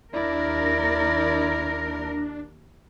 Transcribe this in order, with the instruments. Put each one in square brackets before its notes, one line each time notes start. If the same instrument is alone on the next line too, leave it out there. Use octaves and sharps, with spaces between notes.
[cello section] D#2 A#4 [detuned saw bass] D4 [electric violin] E4 D5